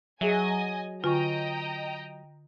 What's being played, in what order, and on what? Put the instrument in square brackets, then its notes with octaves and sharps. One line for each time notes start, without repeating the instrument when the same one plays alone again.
[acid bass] F#3 [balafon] G#4 E5 [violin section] D#5 G#5
[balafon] D3 G#5 C#6 [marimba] F4 [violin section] D#5 G5 A#5